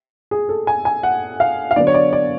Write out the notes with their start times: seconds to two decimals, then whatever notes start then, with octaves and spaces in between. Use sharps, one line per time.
0.31 G#4
0.49 A4
0.67 G#5
0.85 G#5
1.03 F#5
1.40 F5
1.71 F5
1.76 D3 F#3 B3 D5
1.87 C#5
1.94 D5
2.13 D5